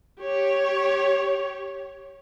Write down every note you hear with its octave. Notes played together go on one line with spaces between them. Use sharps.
G4 C#5